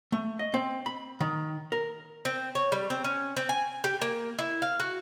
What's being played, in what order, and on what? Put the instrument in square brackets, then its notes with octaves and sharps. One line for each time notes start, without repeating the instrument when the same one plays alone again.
[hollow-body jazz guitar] A3
D#5
C4
B5
D#3
A#4
[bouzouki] C4
C#5
G3
C4
C#4
C4
G#5
G4
A#3
E4
F5
F#4